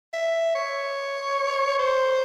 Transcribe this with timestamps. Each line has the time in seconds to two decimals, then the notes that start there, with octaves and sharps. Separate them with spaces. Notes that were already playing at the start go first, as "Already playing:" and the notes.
0.14 E5
0.55 C#5
1.79 C5